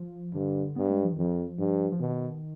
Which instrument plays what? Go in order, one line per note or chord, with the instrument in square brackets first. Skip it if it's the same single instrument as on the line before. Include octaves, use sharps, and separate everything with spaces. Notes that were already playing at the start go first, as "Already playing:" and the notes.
Already playing: [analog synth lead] F3
[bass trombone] G2 [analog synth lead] D3
[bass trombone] G2 [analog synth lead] B3
[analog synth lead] G#3
F3
D#3
[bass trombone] F2 [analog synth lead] F3
[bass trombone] G2
[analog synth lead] F3
[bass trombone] B2 [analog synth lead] D#3